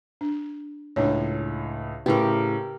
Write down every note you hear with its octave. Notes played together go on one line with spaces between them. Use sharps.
D4
C#2 A2 D4 C#5
A2 C#3 G4 A#4 B4